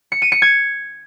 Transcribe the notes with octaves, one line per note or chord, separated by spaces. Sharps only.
C#7
D#7
C#7
G#6